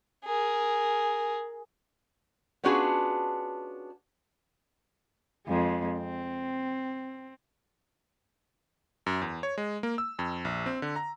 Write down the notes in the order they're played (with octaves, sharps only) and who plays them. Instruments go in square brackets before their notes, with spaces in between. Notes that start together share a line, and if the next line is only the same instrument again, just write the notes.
[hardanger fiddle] G#4 A#4
[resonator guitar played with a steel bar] B3 C#4 D4 F4 F#4 G#4
[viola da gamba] F2 G#3
C4
[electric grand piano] F#2
E2
C#5
G#3
A#3
E6
F2
A#1
C4
D3
A#5